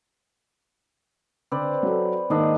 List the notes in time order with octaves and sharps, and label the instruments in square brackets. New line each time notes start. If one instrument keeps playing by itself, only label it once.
[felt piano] D3 [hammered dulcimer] C4 B4 D5
[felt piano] F#3 A4
[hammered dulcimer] G#2 D4 D#5 [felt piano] D#3 A#3